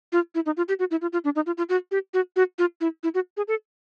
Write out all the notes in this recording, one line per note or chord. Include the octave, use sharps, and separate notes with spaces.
F4
E4
D#4
F4
G4
F#4
E4
F4
F4
D4
D#4
F4
F4
F#4
G4
F#4
F#4
F4
E4
E4
F#4
G#4
A4